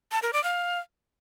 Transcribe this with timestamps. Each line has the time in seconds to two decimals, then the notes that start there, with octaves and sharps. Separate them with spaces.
0.12 A5
0.22 A#4
0.33 D5
0.44 F5